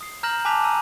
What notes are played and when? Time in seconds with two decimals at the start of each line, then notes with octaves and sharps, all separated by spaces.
0.01 D#6 C7
0.23 A#5 F6 G6 A#6 E7 F#7
0.45 G#5 A5 D6 F#6 B6 F7
0.64 A#5 E6 D#7